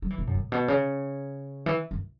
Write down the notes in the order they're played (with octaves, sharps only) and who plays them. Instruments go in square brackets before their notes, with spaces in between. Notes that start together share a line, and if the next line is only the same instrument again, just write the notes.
[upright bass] F#3
E3
B2
F#2
A2
B2
C#3
E3
F#2